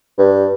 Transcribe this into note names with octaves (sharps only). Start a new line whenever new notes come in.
G2